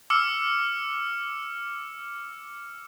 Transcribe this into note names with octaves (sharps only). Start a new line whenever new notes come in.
D6 E6 F6 C#7